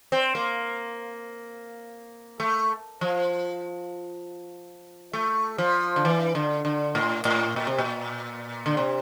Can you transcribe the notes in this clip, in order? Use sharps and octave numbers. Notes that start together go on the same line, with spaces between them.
C4
A#3
A3
F3
A3
F3
D3
E3
D3
D3
A2
A2
A#2
C3
A#2
D3
C3